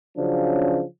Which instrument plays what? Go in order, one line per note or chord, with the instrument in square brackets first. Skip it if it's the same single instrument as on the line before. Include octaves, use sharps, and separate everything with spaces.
[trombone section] C#3 F3 F#3 C#4 D4